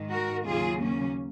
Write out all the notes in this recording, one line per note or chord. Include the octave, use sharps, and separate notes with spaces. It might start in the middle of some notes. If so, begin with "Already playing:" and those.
Already playing: G#2 D#3 G#3
F#4 A#4
D#2 C#3 F#3 F4 G#4
A#3 C#4